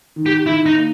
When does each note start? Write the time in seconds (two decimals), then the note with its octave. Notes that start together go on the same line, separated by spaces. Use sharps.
0.16 D#3
0.26 G4
0.46 D#3 E4
0.66 D#4
0.75 A#3